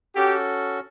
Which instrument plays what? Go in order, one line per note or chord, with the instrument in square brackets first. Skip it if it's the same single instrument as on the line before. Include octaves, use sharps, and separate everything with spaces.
[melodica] C#4 F#4 A4 [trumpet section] G4